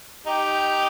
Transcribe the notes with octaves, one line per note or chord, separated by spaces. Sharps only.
D#4 G4